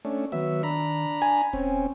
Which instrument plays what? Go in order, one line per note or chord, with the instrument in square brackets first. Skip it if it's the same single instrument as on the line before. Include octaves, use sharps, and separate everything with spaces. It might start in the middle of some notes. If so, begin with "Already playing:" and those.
[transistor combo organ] A3 C#4 D4
[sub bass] D#3 [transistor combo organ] F#3 B3 E5
[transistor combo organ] D4 A#5 B5
[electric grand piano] G#5
[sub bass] D#1 [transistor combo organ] C4 C#4